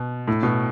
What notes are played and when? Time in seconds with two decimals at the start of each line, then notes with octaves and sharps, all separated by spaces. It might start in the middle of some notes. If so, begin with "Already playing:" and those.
Already playing: B2
0.28 A2
0.43 B2